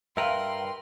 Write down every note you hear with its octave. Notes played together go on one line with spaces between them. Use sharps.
G2 A#4 B4 E5 F5 G5 C6